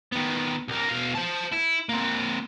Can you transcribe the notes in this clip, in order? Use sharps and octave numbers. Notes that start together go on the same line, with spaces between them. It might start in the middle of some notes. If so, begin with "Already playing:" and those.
D#3 B3
C2 A#3
B2 F5
C5 A5
E4
A#3 C4